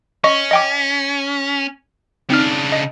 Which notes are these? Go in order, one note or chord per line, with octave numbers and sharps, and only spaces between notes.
C#4 D#5 C#6
D#5 G5 D6
C#3 C4 D4 D#4 F6
D#5